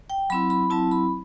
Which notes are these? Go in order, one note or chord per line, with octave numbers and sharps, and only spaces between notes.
G5
F#3 C4 E4 B5
B5
F#3 C4 E4 A5
B5